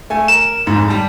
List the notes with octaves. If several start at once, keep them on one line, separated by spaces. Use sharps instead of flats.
A3 G#5
A#4 E7
F1 G#2
G3 A5